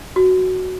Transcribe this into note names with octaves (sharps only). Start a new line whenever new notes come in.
F#4